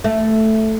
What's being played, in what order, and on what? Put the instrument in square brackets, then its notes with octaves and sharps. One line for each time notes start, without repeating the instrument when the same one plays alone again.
[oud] A3